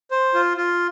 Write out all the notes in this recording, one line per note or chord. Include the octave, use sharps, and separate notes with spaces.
C5
F4
F4